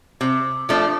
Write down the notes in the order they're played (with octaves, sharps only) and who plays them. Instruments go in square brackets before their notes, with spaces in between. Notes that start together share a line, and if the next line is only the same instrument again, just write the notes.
[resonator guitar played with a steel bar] C3
F3 A3 D4